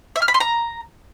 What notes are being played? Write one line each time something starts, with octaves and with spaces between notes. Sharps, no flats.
E5
F6
B5
C6
A#5